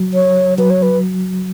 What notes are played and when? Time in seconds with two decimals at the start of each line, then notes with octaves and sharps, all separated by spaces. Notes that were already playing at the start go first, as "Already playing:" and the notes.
Already playing: F#3
0.14 C#5
0.58 F#3 B4
0.70 C#5
0.82 B4